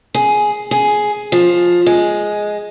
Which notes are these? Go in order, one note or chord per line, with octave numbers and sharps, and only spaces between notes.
G#4
G#4
F3
G#3